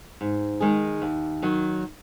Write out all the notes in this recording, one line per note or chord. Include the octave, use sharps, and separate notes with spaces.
G#2
D#3 G#3 D#4 G#4
D#2
D#3 F#3